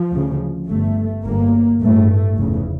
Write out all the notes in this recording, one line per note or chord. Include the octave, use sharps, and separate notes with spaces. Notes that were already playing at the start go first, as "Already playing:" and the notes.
Already playing: F3
D2 C#3
G1 G2 A3
G1 G2 A#3
A1 G2 A3
F1 E2 C#3